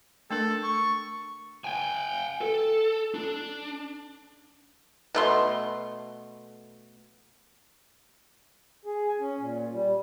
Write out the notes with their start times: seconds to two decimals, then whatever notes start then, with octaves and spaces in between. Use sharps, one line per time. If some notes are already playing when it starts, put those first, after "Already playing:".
0.31 A3 D4 A4 A#4
0.63 C#6
1.64 G5 G#5
2.41 A4
3.14 D4
5.14 B2 A3 C6
8.85 G#4
9.08 G#5
9.20 C#4
9.38 A#2
9.73 G3